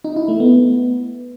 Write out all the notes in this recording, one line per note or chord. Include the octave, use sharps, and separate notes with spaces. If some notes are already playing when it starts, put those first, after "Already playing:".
D#4
E4
A3
B3